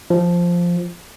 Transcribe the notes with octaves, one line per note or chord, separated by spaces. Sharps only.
F3